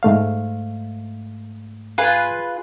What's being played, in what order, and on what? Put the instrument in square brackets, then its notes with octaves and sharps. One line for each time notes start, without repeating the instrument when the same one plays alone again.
[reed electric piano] G#2 A3 F5
[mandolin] F4 G#4 B4